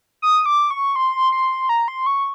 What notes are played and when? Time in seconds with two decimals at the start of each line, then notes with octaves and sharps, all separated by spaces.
0.22 D#6
0.46 D6
0.71 C#6
0.96 C6
1.32 C6
1.69 A#5
1.88 C6
2.06 C#6